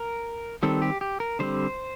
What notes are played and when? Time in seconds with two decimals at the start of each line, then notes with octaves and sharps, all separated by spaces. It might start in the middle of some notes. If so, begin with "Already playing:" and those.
Already playing: A#4
0.63 D#3 G3 C4 A4
0.82 G4
1.01 G4
1.20 A#4
1.39 D3 G3 C4 C5